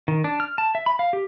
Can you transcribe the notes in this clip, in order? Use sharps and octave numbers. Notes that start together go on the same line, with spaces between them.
D#3
D4
F6
A5
E5
B5
F5
G4